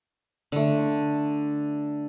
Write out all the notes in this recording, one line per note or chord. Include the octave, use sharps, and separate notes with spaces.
D3 A3